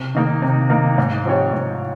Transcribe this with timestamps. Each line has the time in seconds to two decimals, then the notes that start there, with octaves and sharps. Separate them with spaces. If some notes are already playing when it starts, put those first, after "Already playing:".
Already playing: C3
0.15 D#3 A#3 D#4 A#4
0.42 C3
0.70 D#3 A#3 D#4 A#4
0.98 G#2
1.25 F3 C4 G4 C#5
1.53 G#2